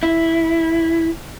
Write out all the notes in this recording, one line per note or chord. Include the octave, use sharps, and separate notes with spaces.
E4